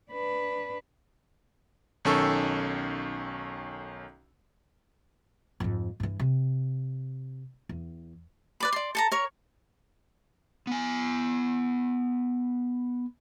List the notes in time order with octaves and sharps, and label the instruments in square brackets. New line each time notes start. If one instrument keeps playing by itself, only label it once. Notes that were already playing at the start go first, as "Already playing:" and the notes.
[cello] D4 B4
[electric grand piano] B1 D#3 C#4 A4 C#6 E6
[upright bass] F2 G#2
G2 E3
C3
E2
[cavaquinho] B4 D5 B5
D5 C6
A4 A5 A#5
A#4 C#5
[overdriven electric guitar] B3 G#5